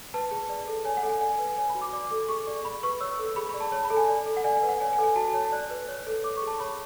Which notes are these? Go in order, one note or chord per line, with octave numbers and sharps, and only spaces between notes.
B4 A5
G#4
D5
A4
C#5 G#5
F#5
A4
G#5
D5 G#5
G#5
B4
G#5
C#5 G#5
F#4 B5
D6
D5 D6
A4 D6
G#4 C#6
D5
D5 B5
B4 C#6
C#5 E6
A4
G#4 B5
B5
D5
A5
C#5 A5
B5
A4
G#5
D5
A4
F#5
D5 G#5
G#5
B4
F#5
C#5 G#5
G#5
A4
G#5
F#4 A5
A5
C#5
A5
D5 F#6
B4
C#5
A4
C#5 D6
C#6
G#4
A5
C#5 B5